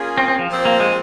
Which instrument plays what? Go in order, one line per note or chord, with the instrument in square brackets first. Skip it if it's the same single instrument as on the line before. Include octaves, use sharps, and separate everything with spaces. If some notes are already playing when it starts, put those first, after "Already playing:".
Already playing: [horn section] A#3 C#4 F4 G#4
[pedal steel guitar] C4
C4
F3
[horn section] A#2 F3 C4 G4
[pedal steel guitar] A#3
G#3